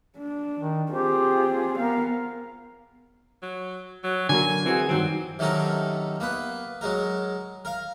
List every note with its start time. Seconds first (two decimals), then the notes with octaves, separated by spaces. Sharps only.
0.17 D4
0.58 D#3
0.92 C4 F4 G4 G#4
1.79 B3 A#4 F5
3.42 F#3
4.04 F#3
4.29 D3 F#3 A#3 G#5
4.66 E3 C4 F#4 G#4
4.89 G2 D#3 F#3 C4
5.39 C3 D#3 F#3 C#4 A4 A#4
6.20 A#3 B3 B4
6.81 F#3 G#3 A#4
7.65 A#4 F5